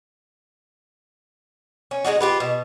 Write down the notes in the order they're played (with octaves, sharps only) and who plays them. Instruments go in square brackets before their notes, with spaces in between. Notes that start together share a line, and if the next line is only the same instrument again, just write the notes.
[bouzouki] C#4
G#3 A3 D#4 F#4
F4 G4 B4
B2